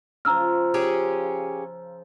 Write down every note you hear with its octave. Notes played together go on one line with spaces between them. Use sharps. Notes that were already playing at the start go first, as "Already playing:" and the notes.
C#3 F3 A#5 E6 F6
C#4 G4 G#4